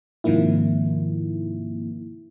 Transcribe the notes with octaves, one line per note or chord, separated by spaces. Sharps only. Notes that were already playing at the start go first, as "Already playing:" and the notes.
G#2 C3 D#3 F3 A#3 E4